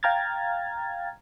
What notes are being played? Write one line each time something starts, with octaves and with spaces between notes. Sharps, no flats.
F5 G5 A#5 F6 G#6 A6